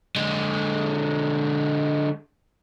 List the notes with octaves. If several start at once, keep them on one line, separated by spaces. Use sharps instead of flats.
D3 G#3